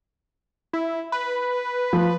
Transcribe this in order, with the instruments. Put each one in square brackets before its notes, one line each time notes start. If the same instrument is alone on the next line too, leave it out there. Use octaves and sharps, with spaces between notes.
[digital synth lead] E4
B4
[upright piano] F3